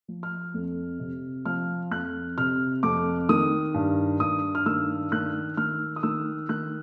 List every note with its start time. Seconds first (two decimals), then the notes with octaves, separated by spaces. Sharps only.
0.08 F3
0.23 F6
0.54 F2
1.00 C3
1.46 F3 F6
1.91 F2 F#6
2.38 C3 F6
2.83 F2 D6
3.29 D#3 D#6
3.74 G2
4.20 G2 D#6
4.55 F6
4.66 D#3 E6
5.12 D#3 F#6
5.57 D#3 F6
5.96 D#6
6.03 D#3 E6
6.49 D#3 F#6